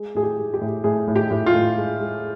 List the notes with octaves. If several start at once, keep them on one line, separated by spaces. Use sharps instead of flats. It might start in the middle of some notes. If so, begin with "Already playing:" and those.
Already playing: G#3
A2 G#4
G4
G#3
G4
A2
A2 G#4
A2
G4
A2
F4
A2
G#3
G#3